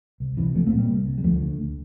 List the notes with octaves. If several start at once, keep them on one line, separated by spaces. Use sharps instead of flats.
C2
C3 E3
C2 F3 A3
A3 C4
A#2
G3 A#3
C2
C3
G3
D2 F3 A3
D3
D2